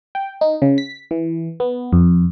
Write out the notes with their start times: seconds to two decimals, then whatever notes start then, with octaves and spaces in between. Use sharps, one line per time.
0.15 G5
0.41 D#4
0.62 C#3
0.78 B6
1.11 E3
1.60 B3
1.93 F2